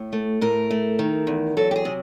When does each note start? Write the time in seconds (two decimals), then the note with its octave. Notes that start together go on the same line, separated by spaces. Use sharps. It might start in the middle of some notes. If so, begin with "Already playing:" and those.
Already playing: A2
0.13 A3
0.41 A2 A#4
0.71 A3
0.99 D#3
1.27 E2
1.57 F#3 A4
1.71 G4
1.76 G#4
1.85 C3